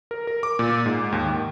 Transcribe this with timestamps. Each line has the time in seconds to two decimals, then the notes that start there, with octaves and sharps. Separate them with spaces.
0.11 A#4
0.27 A#4
0.43 D6
0.59 A#2
0.86 G#2
1.12 D#2
1.26 D#3